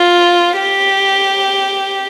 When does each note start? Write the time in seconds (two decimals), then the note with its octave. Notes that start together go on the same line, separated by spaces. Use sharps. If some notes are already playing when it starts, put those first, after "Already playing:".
Already playing: F4
0.60 G4